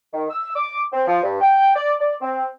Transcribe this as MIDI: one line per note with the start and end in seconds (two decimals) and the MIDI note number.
0.14 0.26 51
0.30 0.55 88
0.56 0.81 86
0.93 1.04 60
1.07 1.22 53
1.23 1.37 43
1.41 1.75 79
1.76 1.93 74
2.00 2.15 74
2.21 2.44 60